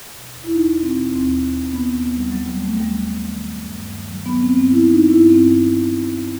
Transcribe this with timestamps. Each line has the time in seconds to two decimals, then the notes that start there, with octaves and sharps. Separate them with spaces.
0.13 B2
0.33 E2
0.44 E4
0.52 E2 D#4
0.73 B2
0.82 C4
0.93 B2
1.12 D#2 C4
1.33 D#2
1.52 D#3
1.72 D#3 B3
1.91 D#2
2.01 B3
2.12 D#2
2.17 G3
2.32 D#3 F#3
2.46 G3
2.51 D#3
2.61 A3
2.72 D#2
2.77 G3
2.92 D#2
3.11 D#3
3.31 D#3
3.51 G2
3.71 G2
3.91 D#3
4.10 D#3 F#3
4.26 B3
4.31 G2
4.41 C4
4.50 G2
4.56 C4
4.70 D#3 E4
4.90 D#3 D#4
5.10 G2 E4
5.30 G2 C4
5.50 D#3
5.70 D#3
5.90 G2
6.10 G2